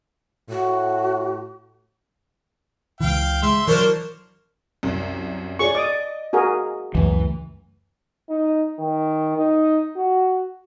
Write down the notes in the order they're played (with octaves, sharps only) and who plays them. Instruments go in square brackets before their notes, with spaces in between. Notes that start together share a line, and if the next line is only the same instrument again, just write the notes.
[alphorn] A2 [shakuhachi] F#4
[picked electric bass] C#2 E3 [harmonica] F5 G5
[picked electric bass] G#3 [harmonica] E5 C6
[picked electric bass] E3 F#3 [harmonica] D4 C5 C#5 [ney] A#4
[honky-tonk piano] C2 F#2
[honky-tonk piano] G#4 C#5 D5 [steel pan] C#6
[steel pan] D5 D6 D#6 [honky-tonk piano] D#5
[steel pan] F#4 G#4 A#4
[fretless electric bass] C#2 F#2 A3 [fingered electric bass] E3
[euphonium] D#4
D#3
D#4
F#4